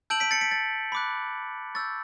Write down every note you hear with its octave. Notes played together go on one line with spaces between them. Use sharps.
A5 E6 G6 D7 F#7
B6 D7
A6 C#7
B6 D7
A6
B5 D6 F#6
C#6 E6 G6 A6